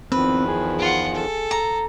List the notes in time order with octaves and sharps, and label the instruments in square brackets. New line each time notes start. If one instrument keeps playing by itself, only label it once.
[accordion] E2 D#3 F3 [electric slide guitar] C4 [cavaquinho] B4
[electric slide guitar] G#4
[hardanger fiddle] F4 F#5
A4
[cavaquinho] A#5